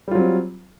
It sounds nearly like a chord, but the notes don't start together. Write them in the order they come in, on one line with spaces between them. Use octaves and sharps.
G3 F4 F#3 C4